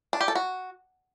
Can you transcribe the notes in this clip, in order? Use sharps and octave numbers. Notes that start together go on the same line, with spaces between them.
D4
G4
A4
F#4